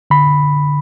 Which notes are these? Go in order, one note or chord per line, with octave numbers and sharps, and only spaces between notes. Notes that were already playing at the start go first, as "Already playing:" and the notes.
D3 B5